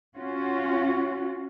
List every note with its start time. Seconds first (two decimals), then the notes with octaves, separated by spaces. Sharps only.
0.16 C#4 F4 F#4